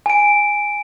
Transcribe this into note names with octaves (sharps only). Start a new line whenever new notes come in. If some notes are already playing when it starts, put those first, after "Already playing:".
G#5 D7